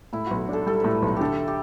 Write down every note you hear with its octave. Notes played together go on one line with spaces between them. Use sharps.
A2 E4
B1 F#4
D4 A4
G3 A4
A2 B4
B1
D3 G4 A4
G4